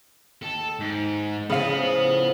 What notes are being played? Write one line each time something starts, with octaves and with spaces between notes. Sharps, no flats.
D#2 A4
G#2
A2 C#3 F3 B3 F5